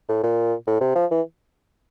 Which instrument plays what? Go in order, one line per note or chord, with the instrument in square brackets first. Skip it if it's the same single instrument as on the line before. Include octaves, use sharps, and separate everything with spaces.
[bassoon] A2
A#2
A2
C3
F3
E3